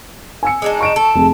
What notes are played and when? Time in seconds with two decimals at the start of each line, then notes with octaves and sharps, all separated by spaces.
0.43 G#5 E6 C#7
0.62 G#3 D4 D#4
0.81 C#6 D7 E7
0.96 A4
1.15 F1 G#4